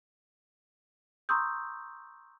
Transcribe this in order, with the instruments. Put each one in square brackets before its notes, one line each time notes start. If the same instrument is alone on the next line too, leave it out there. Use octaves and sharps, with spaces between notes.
[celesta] A#5 C6 C#6 D#6 E6 G6